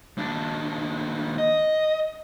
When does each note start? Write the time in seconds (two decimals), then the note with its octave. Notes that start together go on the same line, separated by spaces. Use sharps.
0.18 D#2 D4
1.38 D#5